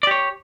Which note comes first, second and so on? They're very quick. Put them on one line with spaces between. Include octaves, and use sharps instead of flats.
D5 G4 C#5